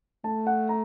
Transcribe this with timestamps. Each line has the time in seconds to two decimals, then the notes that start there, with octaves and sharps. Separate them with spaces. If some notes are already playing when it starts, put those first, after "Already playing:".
0.24 A3 A5
0.47 F#5
0.69 A#5